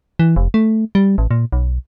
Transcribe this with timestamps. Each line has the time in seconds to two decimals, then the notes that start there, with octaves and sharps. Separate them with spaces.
0.19 E3
0.36 F1
0.54 A3
0.95 G3
1.18 A1
1.31 A#2
1.52 B1